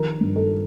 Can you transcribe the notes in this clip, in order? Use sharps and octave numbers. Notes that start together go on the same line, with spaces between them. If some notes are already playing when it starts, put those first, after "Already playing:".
Already playing: D#3 F3 A#4
G2
A4